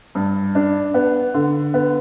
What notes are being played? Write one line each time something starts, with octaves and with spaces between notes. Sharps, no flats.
G2
D4
B3
D3
B3